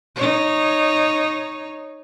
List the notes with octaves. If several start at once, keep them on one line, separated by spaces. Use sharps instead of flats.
D#4 C#5